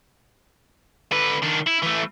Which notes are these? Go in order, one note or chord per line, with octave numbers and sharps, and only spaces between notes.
D3 B4
D#3 D4
E4
E3 A3